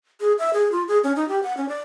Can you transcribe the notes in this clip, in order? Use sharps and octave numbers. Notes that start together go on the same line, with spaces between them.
G#4
E5
G#4
F4
G#4
C#4
D#4
G4
F#5
C#4
D5